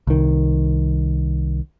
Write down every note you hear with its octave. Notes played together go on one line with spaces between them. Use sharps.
C2 D#3